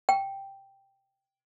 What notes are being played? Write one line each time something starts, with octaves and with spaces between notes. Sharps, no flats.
G5